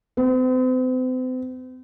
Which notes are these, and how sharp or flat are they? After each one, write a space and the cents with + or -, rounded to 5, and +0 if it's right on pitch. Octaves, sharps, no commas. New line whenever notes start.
C4 -40